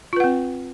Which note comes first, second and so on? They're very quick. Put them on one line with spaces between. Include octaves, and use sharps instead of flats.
F4 B4 F#5 C4